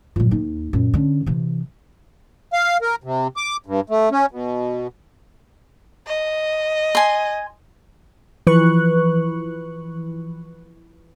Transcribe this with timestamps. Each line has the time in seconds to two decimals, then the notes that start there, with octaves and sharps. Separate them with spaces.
0.16 A#2 F#3
0.31 D#2 D#4
0.73 F#2 A#2
0.94 D3 C#4
1.26 C3 E3
2.53 F5
2.82 A#4
3.04 C3
3.37 D6
3.66 G2
3.90 A3
4.12 C#4
4.31 B2
6.07 D#5
6.95 G#5 C6
8.47 E3 F3 B4 C#6 F#6